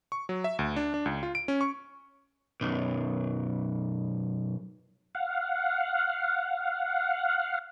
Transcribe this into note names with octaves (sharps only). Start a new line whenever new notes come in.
C#6
F#3
E5
D2
D4
D4
C#2
F4
D7
C#4
C#6
B1 F#2
F5 F#5